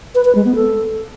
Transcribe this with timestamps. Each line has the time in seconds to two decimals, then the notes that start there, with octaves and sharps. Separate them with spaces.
0.15 B4
0.25 B4
0.35 G#3
0.45 B3
0.55 A4